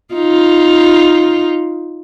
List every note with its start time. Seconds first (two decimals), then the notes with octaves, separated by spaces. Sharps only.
0.14 D#4 F4